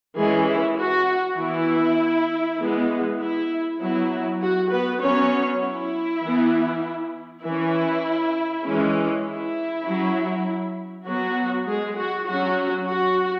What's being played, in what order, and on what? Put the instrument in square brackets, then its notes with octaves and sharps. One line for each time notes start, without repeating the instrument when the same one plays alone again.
[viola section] E3 G#3 C#4 G#4
E4
F#4
E3 B3 E4
E3 G#3 B3
E4
F#3 B3 E4
F#4
B3 B4
F#3 B3 C#4 C#5
E4
E3 B3
E3 C#4 E4
E3 G#3 C#4
E4
F#3 C#4
F#3 B3 F#4
G#3 G#4
F#4
F#3 C#4 F#4
F#4